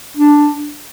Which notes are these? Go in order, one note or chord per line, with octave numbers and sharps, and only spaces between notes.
D4